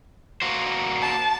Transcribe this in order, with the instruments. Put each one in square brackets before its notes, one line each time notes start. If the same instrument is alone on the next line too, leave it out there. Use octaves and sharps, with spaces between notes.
[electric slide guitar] A#3 F#4 C5
[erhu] A5